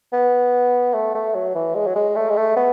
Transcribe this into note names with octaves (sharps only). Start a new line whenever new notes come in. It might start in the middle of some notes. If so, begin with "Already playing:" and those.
B3
A3
A3
F#3
E3
G#3
F#3
G#3
A3
G#3
A3
B3